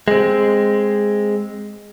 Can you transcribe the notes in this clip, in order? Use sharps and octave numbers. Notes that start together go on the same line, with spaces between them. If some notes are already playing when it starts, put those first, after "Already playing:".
G#3 C4